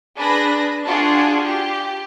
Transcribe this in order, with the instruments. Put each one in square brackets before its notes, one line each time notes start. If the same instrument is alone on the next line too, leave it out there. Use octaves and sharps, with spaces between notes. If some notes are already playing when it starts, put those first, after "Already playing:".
[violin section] D4 G#4 B4 B5 A#6
D4 F4 F#4 G#4
G4